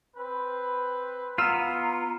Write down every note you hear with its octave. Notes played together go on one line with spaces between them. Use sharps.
C4 B4
B3 F4 A#5 E6 F6